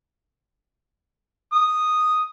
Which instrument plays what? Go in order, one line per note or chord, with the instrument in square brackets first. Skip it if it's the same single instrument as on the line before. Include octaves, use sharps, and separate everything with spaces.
[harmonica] D#6